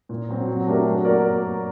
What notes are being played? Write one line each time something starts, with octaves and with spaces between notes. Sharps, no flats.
A#2
F#3 C4
F#3
A3 D4 G4 A#4
F#3
A#3 F#4 A#4 D5